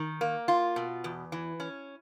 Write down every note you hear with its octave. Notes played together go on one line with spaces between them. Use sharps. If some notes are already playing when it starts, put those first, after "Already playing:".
Already playing: D#3
A#3
F4
B2
E2
E3
C#4